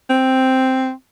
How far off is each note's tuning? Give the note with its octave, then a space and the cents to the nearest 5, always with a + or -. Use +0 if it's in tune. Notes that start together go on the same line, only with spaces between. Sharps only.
C4 +0